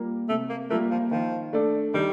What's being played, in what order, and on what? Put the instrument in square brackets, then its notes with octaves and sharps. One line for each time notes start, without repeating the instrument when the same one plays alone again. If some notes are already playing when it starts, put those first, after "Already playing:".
Already playing: [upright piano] G3 A#3 F4 A#4
[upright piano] C3 [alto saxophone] A3
[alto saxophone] A#3
[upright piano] G3 A#3 F4 A#4 [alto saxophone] A3
[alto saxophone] F3
[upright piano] D#3 [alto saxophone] F3
[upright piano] A3 D4 A4 D5
[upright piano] D#3 [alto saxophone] G3